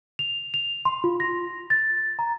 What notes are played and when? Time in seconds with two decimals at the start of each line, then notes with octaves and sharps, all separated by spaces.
0.19 F7
0.54 F7
0.85 C6
1.04 F4
1.20 A#6
1.70 A6
2.19 A#5